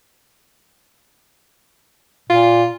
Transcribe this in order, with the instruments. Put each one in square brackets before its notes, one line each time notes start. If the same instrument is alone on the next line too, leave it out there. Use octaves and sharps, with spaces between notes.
[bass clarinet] A#2 [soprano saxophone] F4